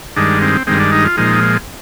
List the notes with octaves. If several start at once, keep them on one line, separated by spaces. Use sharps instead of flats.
G2 D#3 G#3 D4
C4
G2 D#3 G#3 C4
D4
D#4
F4
A#2 F3 G#3 D#4